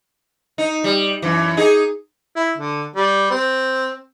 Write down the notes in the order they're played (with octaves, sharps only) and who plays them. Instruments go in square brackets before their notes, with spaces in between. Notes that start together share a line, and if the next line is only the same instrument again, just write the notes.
[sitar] D#4
G3
F#2 E3
D#4 G#4
[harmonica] E4
D3
G3
C4